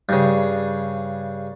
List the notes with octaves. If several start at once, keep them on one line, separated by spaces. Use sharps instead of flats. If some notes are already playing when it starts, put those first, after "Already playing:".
G2 C#3